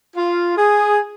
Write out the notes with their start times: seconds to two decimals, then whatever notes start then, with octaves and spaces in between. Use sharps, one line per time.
0.16 F4
0.57 G#4